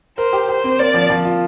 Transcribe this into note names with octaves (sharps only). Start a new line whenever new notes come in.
A#4 C5
G4
G4 C5
C4
A#3 D5
F3
F3
F4